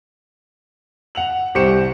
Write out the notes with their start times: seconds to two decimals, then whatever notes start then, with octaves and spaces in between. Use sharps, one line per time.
1.15 F#5 F7 F#7
1.55 C2 G4 C5 C#6 C#7 E7